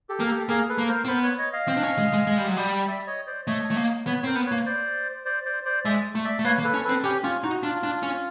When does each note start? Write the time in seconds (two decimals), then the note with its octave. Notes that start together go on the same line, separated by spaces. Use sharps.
0.09 G4 A4
0.20 A#3 A#4
0.29 G4 A4
0.49 A#3 G#4 A#4
0.69 A4 B4
0.78 A#3
0.88 A#4 C5
1.05 C4
1.08 B3 A#4 C5
1.23 B4 C#5
1.39 C#5 D#5
1.53 D#5 F5
1.68 C4
1.77 D4
1.83 C#4
1.98 G#3
2.13 G#3
2.27 G#3
2.38 G3
2.47 F#3
2.57 G3
2.87 D5 E5
3.07 C#5 D#5
3.27 C5 D5
3.47 A3 C#5 D#5
3.71 A3
3.77 A#3
4.06 B3 B4 C#5
4.19 C#5
4.24 C4 A#4 C5
4.36 B3
4.46 B4 C#5
4.52 A#3
4.66 C5 D5
5.25 C5 D5
5.45 C5 D5
5.65 C5 D5
5.85 G#3 D5 E5
6.15 A3
6.25 D5 E5
6.39 A3
6.45 A#3 B4 C#5
6.59 A#3
6.64 A4 B4
6.74 C#4
6.84 C4 A4 B4
7.04 C#4 G4
7.23 C#4 F4
7.44 D#4 F#4
7.63 D4 F4
7.83 D4
8.03 C#4